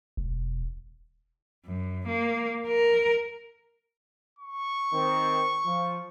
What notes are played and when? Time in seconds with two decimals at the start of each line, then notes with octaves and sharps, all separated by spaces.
0.17 E1
1.67 F#2
2.08 A#3
2.67 A#4
4.39 C#6
4.93 D#3 C4
5.65 F3